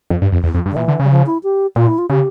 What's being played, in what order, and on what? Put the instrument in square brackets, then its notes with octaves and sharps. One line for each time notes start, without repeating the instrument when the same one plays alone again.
[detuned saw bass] F2
G2
F2
E2
F2
G2
[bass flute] D3
[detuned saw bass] A#2 [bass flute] E3
[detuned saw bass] D3
[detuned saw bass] C#3 [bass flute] G3
[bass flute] F3
E4
G4
[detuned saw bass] A#2 [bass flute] F4
[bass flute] E4
F4
[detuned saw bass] C#3 [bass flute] G4